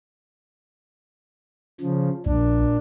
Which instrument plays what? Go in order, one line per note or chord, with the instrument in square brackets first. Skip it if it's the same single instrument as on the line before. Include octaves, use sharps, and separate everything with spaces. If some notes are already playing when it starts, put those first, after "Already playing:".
[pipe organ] C#3 F3
[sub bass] A#1 [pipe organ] A#2 D4